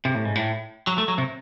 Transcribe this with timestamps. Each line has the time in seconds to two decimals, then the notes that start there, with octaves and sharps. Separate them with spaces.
0.05 C3
0.15 A2
0.25 G#2
0.35 A2
0.87 F#3
0.98 A3
1.08 F#3
1.18 C3